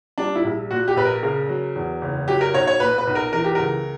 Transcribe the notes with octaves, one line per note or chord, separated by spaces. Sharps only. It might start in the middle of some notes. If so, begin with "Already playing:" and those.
G3 D4
E4
A#1
A#2 F#4
G4
A#1 B4
A#4
C#3 A#4
F#3
E2
F#1
F#3 G4
A#4
B1 C#5
C#5
A#2 B4
B4
B1
A#4
E3 A#4
G4
C#2 A#4